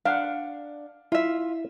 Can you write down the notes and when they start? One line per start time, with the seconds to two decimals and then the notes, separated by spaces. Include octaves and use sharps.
0.05 D4 F5 F#5
1.12 E4 F4 E5